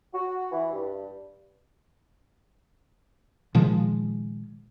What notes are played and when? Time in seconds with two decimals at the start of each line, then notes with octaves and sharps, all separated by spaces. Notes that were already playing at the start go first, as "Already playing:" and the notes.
0.13 F#4
0.51 E3
0.72 G2
3.55 A#2 D#3 F3 G#3